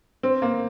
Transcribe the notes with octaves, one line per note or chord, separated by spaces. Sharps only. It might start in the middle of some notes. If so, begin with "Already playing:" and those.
C4
A#3